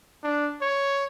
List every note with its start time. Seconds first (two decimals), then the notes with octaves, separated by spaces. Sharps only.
0.24 D4
0.62 C#5